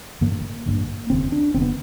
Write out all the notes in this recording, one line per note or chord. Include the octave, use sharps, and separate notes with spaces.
A1 G2 D3 A#3
A1 G2 D3
F1 D#2 C#3 C4
D4
F1 D#2 C#3 C4
B3